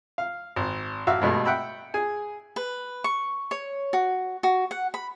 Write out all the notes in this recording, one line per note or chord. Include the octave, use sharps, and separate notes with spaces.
F5
G#1
A1 F#4 E5 F5 E6
G2 B2 G#3 A3
E5 F#5 G5 B5 E6
G#4 G#5
B4
C#6
C#5
F#4
F#4
F#5
B5